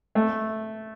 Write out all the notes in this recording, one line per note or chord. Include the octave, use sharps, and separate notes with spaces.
A3